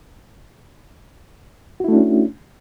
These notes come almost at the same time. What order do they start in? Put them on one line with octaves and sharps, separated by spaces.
F#4 E4 A3 D4 C#4